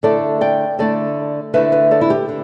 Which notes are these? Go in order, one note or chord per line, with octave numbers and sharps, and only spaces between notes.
D3 A3 E4 A4 D5
D5 G5
D3 A3 E4 A4 D5
D3 A3 E4 B4 E5
B4 E5
A4 D5
E4
G4
D3